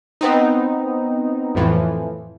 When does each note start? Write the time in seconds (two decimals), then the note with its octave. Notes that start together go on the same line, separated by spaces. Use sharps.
0.21 B3 C4 D#4
1.55 F2 A2 E3 F3